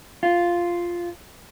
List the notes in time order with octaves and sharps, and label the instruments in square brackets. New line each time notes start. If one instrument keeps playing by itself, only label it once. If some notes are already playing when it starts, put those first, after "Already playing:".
[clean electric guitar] F4